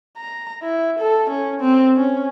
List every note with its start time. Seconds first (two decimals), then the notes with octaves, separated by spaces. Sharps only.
0.18 A#5
0.62 E4
0.99 A4
1.30 C#4
1.61 C4
1.96 C#4